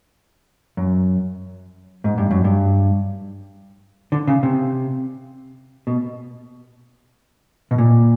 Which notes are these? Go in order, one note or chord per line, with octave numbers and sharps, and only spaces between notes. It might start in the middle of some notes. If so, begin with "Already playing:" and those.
F#2
G#2
G2
F#2
G2
D3
C#3
C3
B2
B2
A#2